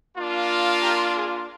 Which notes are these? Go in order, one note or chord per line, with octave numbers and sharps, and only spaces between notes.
A#3 D4 F4
G4 A#4
G#4